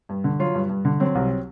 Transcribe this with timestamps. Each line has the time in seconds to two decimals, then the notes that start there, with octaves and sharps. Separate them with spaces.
0.09 G2
0.24 D3
0.39 F#3 F4
0.55 G2
0.69 G2
0.85 D3
1.00 F#3 C4
1.15 C2